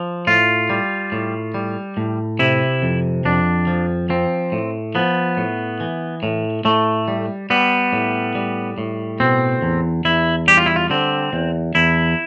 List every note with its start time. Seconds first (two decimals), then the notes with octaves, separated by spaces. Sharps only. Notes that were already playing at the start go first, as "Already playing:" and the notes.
Already playing: F3
0.27 A2 F4
0.70 G3
1.12 A2
1.54 G3
1.97 A2
2.39 C3 E4
2.83 F2
3.25 F2 D4
3.67 F3
4.10 F3 C4
4.52 A2
4.95 F3 B3
5.37 A2
5.80 E3
6.23 A2
6.65 A2 A3
7.08 G3
7.50 G3 B3
7.93 A2
8.35 G3
8.78 A2
9.20 B2 C4
9.62 E2
10.05 E2 E4
10.48 G3 G4
10.57 F4
10.66 E4
10.76 F4
10.90 D3 C4
11.33 E2
11.75 E2 E4